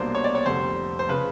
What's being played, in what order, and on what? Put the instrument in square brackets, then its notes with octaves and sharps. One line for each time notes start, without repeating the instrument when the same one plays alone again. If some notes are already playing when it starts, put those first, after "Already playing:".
Already playing: [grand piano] C2 B2 F#3 A#3 D4 C5
C#5
D5
C#5
F1 F2 D3 G3 C5
C5
C#3 F3 B4